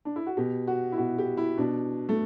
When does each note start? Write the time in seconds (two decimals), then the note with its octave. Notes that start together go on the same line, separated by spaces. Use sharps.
0.05 D4
0.16 E4
0.27 F#4
0.37 B2 G4
0.67 F#4
0.92 E4
0.97 B2 F#4
1.18 G4
1.37 E4
1.58 B2 D4
2.09 A3